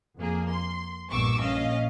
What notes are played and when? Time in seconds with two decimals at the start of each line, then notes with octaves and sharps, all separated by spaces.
0.18 F2 A#3 G#4
0.51 C6
1.09 A#1 G2 B2 C#6 D6 E6
1.41 A#1 C#4 D#5 F5